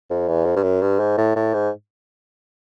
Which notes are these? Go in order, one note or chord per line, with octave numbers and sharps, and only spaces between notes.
F2
E2
F2
G2
F#2
G2
G#2
A2
A2
G#2